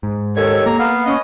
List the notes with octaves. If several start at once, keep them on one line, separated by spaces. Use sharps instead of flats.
G#2
D#2 A4 C#5
A#3 A#5
B3 F5
C#4 D#5